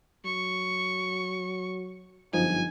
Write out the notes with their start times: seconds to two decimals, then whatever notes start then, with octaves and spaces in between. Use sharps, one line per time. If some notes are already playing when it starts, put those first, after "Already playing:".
0.25 F#3 C#6
2.33 G1 F#2 F3 D#4 G#5